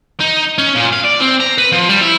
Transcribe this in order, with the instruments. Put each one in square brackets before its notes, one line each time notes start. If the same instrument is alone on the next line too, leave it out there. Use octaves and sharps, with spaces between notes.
[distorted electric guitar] D#4
C#4
A#2
F5
D5
C4
A#5
B4
F3
G3
E4